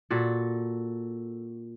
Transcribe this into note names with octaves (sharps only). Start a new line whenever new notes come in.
A#2 F#4 A4